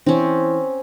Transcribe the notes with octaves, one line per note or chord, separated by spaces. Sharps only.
E3 C4 C#4